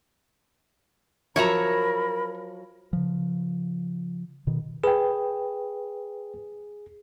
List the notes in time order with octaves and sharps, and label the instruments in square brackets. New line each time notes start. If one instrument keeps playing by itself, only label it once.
[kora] F3 F#3 [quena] A#4 [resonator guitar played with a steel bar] C#5 E5 A#5 [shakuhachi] B5
[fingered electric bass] C#3 F3
B2 D#3
[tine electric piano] G#4 [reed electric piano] B4 G5